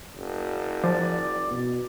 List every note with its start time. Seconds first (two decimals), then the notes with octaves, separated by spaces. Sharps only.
0.15 F#1
0.84 F3 D5
1.51 B2